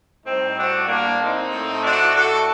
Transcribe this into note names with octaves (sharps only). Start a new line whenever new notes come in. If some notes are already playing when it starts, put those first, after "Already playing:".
A2 G3 C4 D#4
D4 F#4
A#3 D4
C4 D#4
A2 A3
D4 F#4
F#4 A4